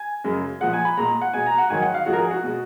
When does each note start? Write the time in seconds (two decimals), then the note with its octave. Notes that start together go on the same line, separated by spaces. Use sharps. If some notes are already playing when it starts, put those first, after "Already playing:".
Already playing: G#5
0.24 F#2 C#3 G#3
0.61 A#2 F3 G#3 F#5
0.73 G#5
0.85 B5
0.97 A#2 G#3 A#5
1.21 F#5
1.33 B2 G#3 G#5
1.46 A#5
1.58 F#5
1.70 G#2 D#3 F#3 G#5
1.82 F#5
1.94 F5
2.06 G#2 F3 G#3 F#4
2.13 A#4
2.19 G#4
2.31 F#4
2.43 B2 G#3